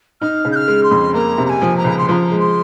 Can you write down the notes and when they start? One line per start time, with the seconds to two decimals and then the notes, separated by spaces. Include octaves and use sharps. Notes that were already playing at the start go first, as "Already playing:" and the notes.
0.21 D#4 F6
0.45 C#3
0.52 G6
0.56 F6
0.68 G#3
0.84 C6
0.91 F2
1.14 A#3 A#5
1.38 C3
1.46 A#5
1.49 G#5
1.62 F3
1.77 A#5
1.84 C#2
1.98 C6
2.08 F3 A#5 C6
2.31 G#3
2.40 C6